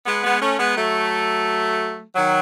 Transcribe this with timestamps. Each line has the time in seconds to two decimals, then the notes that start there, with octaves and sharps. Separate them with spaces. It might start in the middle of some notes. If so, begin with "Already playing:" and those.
0.05 G#3 B3
0.23 G#3 B3
0.40 A3 C#4
0.58 G#3 B3
0.75 F#3 A3
2.14 D#3 F#3